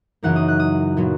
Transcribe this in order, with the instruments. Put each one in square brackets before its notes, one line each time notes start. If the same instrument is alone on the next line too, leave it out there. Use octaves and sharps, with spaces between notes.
[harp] F#2 C#3 E3 A#3 D#4 F#5
D#6
F#6
D#6
A#2 F#3 B3